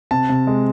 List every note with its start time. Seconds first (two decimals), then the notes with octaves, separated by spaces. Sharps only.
0.11 C3 A5
0.29 C3
0.47 G#3